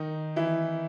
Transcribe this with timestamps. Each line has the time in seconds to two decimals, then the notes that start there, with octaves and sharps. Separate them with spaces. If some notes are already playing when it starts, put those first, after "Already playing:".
Already playing: D#3 D#4
0.36 E3 E4